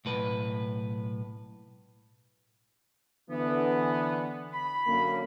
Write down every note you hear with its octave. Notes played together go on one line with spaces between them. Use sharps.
B1 A2 B4
D3 E3 B3
B5
F#2 D3 A#3